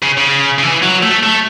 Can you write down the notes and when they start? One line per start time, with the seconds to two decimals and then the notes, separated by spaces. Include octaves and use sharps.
0.03 C#3
0.18 C#3
0.59 C#3
0.63 E3
0.82 F#3
1.03 A3
1.23 A3